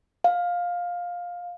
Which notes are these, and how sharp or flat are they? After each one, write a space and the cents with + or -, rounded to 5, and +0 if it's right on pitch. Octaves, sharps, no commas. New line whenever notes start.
F5 +15